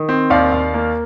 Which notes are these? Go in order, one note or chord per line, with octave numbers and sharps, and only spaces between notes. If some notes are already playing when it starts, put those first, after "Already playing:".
Already playing: D#3
C4
D#2 D5 F5
D#2
A#3